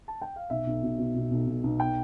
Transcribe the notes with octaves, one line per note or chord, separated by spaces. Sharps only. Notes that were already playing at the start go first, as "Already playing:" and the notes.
A5
G5
F5
B1 E5
B1
B2
B2
B2
B1
B1
B1
G5